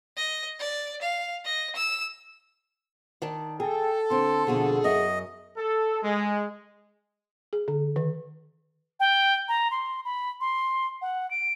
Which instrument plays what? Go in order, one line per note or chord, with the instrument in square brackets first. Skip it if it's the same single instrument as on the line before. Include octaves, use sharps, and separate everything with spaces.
[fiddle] D#5
D5
F5
D#5
E6
[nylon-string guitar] D#3 D5 A5
[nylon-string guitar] G#4 [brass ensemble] A4 [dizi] G5
[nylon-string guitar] D3 C4 [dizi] C6
[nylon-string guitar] F2 B2 D3 [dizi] G#4
[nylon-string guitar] F#2 E5 [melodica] D#5
[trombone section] A4
G#3
[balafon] G#4
D3
D#3
[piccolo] G5
A#5
C6
B5
C6
F#5
D7